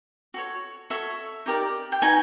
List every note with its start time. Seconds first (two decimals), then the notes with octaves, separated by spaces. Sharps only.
0.34 F#4 A4 C#5
0.90 F#4 A4 C#5 E5
1.46 D#4 G4 A#4 D5
1.92 G5
2.02 D#4 F#4 B4 G#5